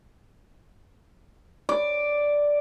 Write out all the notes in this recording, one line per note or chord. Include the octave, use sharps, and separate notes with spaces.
D5